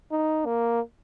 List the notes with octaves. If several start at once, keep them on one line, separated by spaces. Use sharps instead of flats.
D#4
A#3